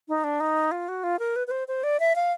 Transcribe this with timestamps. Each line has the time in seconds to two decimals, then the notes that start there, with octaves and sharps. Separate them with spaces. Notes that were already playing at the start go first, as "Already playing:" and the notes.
0.08 D#4
0.24 D4
0.40 D#4
0.71 F4
0.88 F#4
1.04 F4
1.19 A#4
1.36 B4
1.47 B4
1.51 C5
1.68 C5
1.83 D5
2.00 E5
2.16 F5